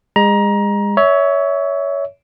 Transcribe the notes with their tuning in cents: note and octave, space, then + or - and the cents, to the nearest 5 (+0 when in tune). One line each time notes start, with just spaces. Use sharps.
G#3 -30 A#5 +20
C#5 +20 E5 -15